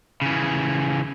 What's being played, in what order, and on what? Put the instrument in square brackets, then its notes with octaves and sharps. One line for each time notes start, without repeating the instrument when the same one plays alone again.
[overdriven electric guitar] C#3 E3